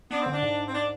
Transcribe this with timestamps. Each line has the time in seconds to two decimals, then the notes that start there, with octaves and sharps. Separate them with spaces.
0.11 B3 D4
0.22 D3 C4
0.33 D4
0.42 G#2
0.68 C4
0.74 D4